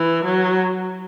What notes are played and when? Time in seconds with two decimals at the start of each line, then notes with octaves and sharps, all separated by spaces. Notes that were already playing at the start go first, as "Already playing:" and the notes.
Already playing: E3
0.25 F#3